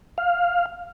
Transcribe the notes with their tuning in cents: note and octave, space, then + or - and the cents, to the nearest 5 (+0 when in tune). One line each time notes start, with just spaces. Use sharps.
F5 +5